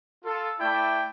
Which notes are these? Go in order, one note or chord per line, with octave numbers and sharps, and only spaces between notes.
F4 A4
A3 E4 D5 G5